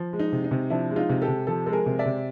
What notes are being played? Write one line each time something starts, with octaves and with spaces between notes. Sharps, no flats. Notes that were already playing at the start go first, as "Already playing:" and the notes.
Already playing: F3
G#3
D#4
C3
D#4
C3
F3 D4 E4
G#3
D#4 F4
C3
G4 A4
C3
F3 G4 A4
G#3 A4
G#4 A#4
C3
D5 E5
C3